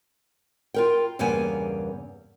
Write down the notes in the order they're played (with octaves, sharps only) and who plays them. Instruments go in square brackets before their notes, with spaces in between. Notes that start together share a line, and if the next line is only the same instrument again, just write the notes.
[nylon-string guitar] F4 A#4 G5
E2 G2 C#3 A#3 B3 G#5